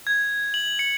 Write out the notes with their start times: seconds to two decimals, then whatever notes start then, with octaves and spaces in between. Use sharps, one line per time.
0.07 G#6
0.54 F#7
0.79 C#7